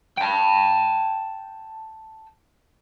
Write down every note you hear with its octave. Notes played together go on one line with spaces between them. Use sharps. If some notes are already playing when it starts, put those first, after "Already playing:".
G5 A5